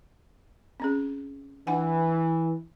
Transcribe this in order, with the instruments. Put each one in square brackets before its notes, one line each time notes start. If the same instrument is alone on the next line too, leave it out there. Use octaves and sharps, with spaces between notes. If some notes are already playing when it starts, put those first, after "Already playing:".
[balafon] C4 C#4 G#4
[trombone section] E3 [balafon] D4 F#5 G#5